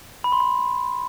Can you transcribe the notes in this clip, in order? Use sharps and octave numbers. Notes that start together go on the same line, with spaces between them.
B5
C6
B5